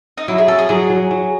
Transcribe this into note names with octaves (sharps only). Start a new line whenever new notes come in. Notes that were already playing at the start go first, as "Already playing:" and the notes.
D#4
F#3 E4
G#4
C#4 A4
G#4
F#3 G#4
F#3
F#3